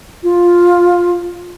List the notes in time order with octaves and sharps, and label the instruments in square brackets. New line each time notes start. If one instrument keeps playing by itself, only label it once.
[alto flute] F4